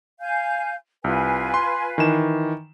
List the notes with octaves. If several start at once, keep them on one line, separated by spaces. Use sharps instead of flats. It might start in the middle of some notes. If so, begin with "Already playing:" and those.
F5 G#5 G6
C2 F4 B4 G#5
C6
D#3 E3 E7